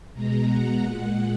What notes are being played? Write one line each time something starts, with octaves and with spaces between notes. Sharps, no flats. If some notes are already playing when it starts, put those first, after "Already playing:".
B2 G#3 A#5
F#5
A#2 G#3 F#5